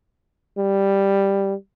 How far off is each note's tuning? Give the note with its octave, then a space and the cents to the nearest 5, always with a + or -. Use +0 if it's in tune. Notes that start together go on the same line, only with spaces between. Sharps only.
G3 +5